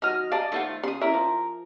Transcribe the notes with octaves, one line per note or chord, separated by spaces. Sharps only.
D#3 F#3 D#5 F6
D5 D#5 F5 A5 A#5
D#3 A3 E4 F4 C5 F#5
C#3 C6 D#6
C#4 E4 A#4 E5
F3 C5